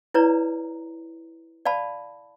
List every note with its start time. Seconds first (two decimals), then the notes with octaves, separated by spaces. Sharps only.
0.14 E4 B4 C#5 D5 A#5
1.65 D5 F5 A5 B5